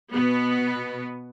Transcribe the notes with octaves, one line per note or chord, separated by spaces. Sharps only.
B2 B3